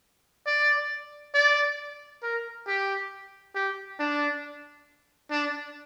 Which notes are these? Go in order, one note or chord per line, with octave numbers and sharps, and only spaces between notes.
D5
D5
A#4
G4
G4
D4
D4